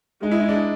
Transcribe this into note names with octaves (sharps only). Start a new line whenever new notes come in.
G#3 D#4
E4
D#4
D4